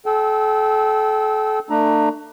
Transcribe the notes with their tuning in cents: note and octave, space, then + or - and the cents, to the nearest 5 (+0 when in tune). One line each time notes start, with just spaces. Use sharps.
A4 -35 G5 -25 E6 -20
A3 +35 D4 +35 A#5 +25